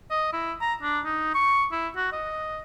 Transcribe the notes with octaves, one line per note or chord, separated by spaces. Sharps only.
D#5
E4
A#5
D4
D#4
C#6
E4
F#4
D#5